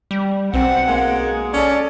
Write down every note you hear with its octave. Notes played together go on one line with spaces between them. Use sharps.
G3
B1 C4 F#5
G#3 A#3
G#4
C#4 A4 D5